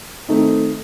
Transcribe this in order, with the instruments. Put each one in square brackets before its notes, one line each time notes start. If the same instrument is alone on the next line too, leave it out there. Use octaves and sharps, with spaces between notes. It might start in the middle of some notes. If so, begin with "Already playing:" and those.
[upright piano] D#3 A3 C4 D#4